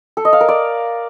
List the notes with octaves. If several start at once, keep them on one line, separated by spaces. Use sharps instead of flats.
A4
D#5
F5
A#4
D5